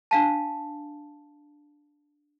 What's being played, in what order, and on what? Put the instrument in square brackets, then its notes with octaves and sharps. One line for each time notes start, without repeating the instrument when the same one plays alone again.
[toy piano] D4 F5 A5